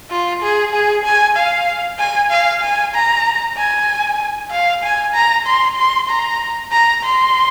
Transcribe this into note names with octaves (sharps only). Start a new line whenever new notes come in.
F4
G#4
G#4
G#5
F5
G#5
F5
G#5
A#5
G#5
F5
G#5
A#5
C6
C6
A#5
A#5
C6